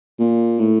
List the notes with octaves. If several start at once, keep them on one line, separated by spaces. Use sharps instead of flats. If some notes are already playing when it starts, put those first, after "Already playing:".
A#2
A2